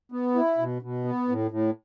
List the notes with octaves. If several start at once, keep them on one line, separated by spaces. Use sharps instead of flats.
B3
E4
B2
B2
B3
A2
A2